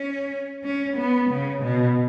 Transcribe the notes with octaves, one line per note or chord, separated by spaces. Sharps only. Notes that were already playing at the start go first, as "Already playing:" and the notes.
Already playing: C#4
C#4
B3
C#3
B2